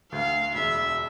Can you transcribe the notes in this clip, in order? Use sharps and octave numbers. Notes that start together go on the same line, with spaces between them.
D2 F5
E1 E5